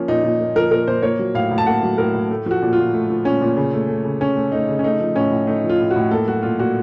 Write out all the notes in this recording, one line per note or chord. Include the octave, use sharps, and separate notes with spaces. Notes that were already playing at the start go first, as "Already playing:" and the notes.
Already playing: F3 A#3 C#4
A#2 D#4
A#2
A#3
F3 A#4
A#2 A#4
A#2 C5
A#3 C#5
F#3
A2 F5
A2
A5
A#3 F#5
F#3
A2 A#4
A2
A3
F3 F#4
A#2
F4
A#2
A3
F3
A#2 C#4
A#2
C#3
A3
A3
C#3
C#3 C#4
A3
A3 D#4
C#3
C#4
A3 D#4
F3
A2 C#4
A2
A3 D#4
F3
F4
A2
F#4
A2
A#3 A4
F#3 F#4
A#2 F4
A#2 F#4